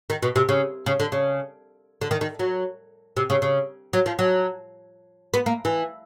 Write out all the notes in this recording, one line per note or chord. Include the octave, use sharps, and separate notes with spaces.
D#3
B2
C3
C#3
C#3
D3
C#3
D3
D#3
D#3
F#3
C3
C#3
C#3
F#3
F3
F#3
B3
A#3
E3